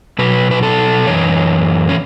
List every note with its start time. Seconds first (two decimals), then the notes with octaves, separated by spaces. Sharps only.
0.19 B2 F#3 B4
0.51 B4
0.63 A4
1.07 F#2 E3 C#5
1.89 C#4